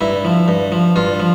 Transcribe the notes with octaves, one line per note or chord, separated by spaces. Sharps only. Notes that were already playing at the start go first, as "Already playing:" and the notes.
G2 E4
F3
G2
F3
G2 F4
F3